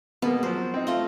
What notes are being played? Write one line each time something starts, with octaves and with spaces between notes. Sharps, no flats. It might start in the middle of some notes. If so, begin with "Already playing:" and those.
B2 G#3 A#3 B3
F3 F#3 C5
C4 D#4
A3 F4 D#5